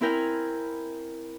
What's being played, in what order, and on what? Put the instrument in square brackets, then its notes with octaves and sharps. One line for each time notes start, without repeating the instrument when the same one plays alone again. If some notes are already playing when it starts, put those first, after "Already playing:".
[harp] C4 E4 A#4 G5 G#5 F6